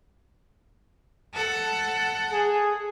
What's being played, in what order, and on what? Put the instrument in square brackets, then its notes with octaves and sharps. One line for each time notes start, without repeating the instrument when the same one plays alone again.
[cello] A4 F#5
[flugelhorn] G#4